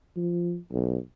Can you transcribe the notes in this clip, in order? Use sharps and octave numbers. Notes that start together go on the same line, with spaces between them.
F3
B1